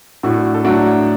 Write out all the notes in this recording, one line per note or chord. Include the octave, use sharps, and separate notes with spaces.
A2 D4 F#4
A4
F#3 A3 D4 F#4